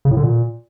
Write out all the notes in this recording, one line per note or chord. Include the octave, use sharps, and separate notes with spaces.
C#3
A2
D3
A#2